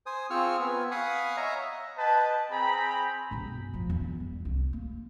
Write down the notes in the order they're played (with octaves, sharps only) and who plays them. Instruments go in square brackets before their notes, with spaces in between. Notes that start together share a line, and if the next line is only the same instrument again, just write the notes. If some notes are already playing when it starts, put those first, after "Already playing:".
[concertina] C5 G#5 D#6
C4 F4 G#4 C#6 E6 F6
B3 G#5
F5 F#5 G#5 B5 C#6 D#6
C#5 D#5 E5 A#5
[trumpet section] B4 D#5 G5 A5
C4 G#4 G5 A#5 B5
[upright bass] B1 G2
F2 F3
E2
G3
C2
A#3